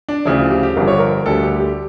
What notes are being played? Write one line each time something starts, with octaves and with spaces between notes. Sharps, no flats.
D4
D2 C#3 F3 E4
F4
G4
G4
G1 G2 D3 F3 A#4
C#5
A#4
D2 D3 G3 A4
G4
G4